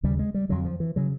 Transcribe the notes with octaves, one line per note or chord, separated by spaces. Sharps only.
D#2 C#3 G3
G#3
G3
F2 D3 F#3
F3
E3
C#3 F#3